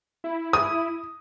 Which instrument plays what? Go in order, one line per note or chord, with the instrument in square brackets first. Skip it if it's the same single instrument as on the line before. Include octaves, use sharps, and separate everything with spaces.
[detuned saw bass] E4
[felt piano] D#6